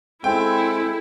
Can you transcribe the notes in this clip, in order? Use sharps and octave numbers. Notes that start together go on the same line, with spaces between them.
G#3 C4 E4 A4 G5